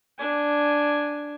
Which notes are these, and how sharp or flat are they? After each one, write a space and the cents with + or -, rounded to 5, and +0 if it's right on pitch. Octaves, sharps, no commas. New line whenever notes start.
D4 +0 G#5 +0